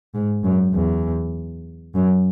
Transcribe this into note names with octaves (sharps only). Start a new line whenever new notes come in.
G#2
F#2
E2
F#2